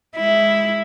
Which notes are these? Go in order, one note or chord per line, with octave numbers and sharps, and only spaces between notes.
G#3 E4